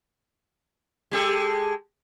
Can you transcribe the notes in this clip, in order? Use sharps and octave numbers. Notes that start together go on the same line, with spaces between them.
G#3 G4 A4